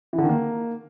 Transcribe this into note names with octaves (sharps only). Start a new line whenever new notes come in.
E3
D3
D#3
A#3